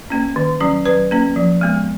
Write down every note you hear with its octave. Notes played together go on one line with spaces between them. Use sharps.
A#3 C#4
D#3
F#3 C#4
F#3 B4
A#3 C#4
F3
G#3 B3